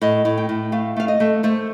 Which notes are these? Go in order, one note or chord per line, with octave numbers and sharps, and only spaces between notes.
A2 D#5
A2
G5
A2
A3 F5
A3 F5
D#5
A3
A3 C5